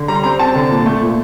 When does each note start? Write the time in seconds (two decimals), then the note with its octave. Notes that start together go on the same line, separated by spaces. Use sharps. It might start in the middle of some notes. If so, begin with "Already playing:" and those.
Already playing: D3
0.08 G3 A#5
0.15 C6
0.24 C4 A#5
0.39 C4 A5
0.55 D3
0.71 A#2
0.86 A3
1.02 A#2